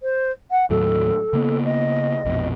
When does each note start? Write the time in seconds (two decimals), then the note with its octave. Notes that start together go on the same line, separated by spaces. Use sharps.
0.02 C5
0.51 F#5
0.70 D#2 A2 F#3 A4
1.33 C#3 A#3 B3
1.64 D#5
2.25 A#1 F2 B2